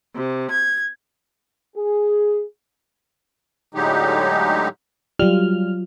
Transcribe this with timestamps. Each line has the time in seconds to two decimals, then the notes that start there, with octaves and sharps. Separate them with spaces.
0.15 C3
0.52 G#6
1.76 G#4
3.74 A2 D3 F#3 G#3 D#4 G4
5.19 F#3 G3 F4 F6